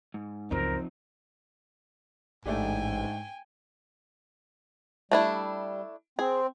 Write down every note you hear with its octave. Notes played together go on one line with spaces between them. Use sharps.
G#2
C#2 F#2 F3 C4 D#4 A#4 C5
A1 G#2 A3 D4 G4 G5 G#5
G3 A3 D4 E4
C4 G#4